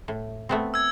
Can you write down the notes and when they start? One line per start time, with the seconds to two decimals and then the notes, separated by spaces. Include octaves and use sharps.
0.08 A2
0.49 A3 B3 C4
0.74 E6 G#6